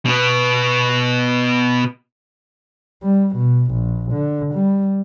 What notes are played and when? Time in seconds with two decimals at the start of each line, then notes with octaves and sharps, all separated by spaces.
0.05 B2 B3
3.03 G3
3.36 B2
3.72 A#1
4.12 D3
4.54 G3